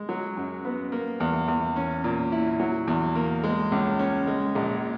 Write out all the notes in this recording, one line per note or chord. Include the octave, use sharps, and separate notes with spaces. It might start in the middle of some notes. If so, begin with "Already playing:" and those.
Already playing: G#3
F#3
F#2
B3
A#3
E2
E2
C#4
A#2
E4
F#3
E2
A#3
G#3
C#2
C#4
G#3
A#1